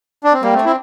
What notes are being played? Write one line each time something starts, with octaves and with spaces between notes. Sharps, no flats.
D4
C4
G3 A#3 G4
A3 C4
D4
C4 E4